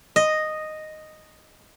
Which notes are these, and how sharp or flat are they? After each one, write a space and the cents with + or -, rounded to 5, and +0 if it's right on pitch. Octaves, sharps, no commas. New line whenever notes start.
D#5 -5